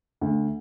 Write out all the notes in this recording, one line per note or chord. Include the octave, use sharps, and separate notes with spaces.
D2